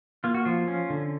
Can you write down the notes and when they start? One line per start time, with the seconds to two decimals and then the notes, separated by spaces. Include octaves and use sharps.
0.24 A#3 F4
0.34 F#4
0.45 F3 F4
0.68 C#4
0.90 D3